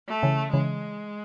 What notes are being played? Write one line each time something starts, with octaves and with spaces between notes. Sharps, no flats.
A3
C#3 E3
C#3 E3 G#3